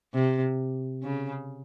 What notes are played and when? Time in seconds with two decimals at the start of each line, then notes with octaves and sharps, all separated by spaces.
0.13 C3
1.03 C#3